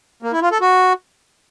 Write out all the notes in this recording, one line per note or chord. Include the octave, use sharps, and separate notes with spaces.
A#3
E4
F4
A4
F#4